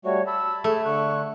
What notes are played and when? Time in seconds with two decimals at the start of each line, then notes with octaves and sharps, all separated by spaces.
0.05 G3 A3 F#4 C#5
0.27 A5 B5 E6
0.64 A3 G#4
0.85 D3 C#6 F#6